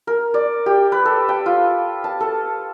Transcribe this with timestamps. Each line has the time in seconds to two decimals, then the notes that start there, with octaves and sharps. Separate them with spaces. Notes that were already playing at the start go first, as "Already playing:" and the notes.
0.07 A#4
0.34 D5
0.66 G4
0.92 B4
1.05 A4
1.29 G5
1.46 F4
2.04 A5
2.20 A4